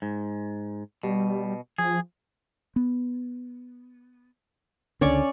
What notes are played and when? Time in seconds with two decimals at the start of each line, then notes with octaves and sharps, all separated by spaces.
0.02 G#2
1.03 B2 G3
1.78 F3 G#4
2.76 B3
5.01 C#2 D3 C#4 D5 C#6